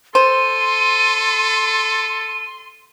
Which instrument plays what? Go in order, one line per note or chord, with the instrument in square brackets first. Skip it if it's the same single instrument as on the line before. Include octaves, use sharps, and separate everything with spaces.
[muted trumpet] A4 [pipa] C5 [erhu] C6 [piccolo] D#7